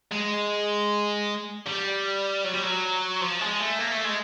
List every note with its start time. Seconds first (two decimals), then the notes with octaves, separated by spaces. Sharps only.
0.12 G#3
1.66 G3
2.44 F#3
2.53 G3
2.62 F#3
3.21 F3
3.40 G#3
3.60 A3
3.79 A#3
3.92 A3
4.05 G#3